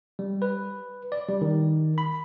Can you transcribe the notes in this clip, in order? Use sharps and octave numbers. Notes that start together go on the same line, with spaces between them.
G3
B4
D5
G3
D#3
B5